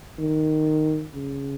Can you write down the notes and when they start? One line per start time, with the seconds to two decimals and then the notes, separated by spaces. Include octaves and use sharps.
0.19 D#3
1.15 C#3